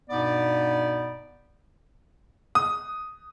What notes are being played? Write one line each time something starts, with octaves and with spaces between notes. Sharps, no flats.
G2 B2 B3 D#4 D5
D#6